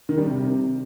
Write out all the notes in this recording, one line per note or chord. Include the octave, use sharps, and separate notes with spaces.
D#3
G3
C3